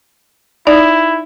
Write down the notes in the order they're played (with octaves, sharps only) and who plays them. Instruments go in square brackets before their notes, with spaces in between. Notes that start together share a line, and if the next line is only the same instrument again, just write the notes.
[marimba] D#4 D5 [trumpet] E4